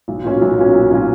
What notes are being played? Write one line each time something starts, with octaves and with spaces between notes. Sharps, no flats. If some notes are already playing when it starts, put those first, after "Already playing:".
B1
A#2 F#3 C#4
B1
A#2 F#3 C#4
B1
A#2 F#3 C#4